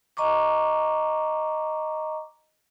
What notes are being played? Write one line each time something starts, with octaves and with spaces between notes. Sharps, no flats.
D#5 A#5 C#6 D6